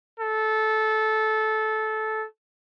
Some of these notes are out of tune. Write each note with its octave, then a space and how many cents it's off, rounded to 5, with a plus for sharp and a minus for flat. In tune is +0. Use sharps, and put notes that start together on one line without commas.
A4 -15